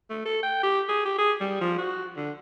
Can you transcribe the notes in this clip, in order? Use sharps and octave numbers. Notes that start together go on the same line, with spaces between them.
A3
A4
G5
G4
G#4
G4
G#4
G3
F3
F#4
D3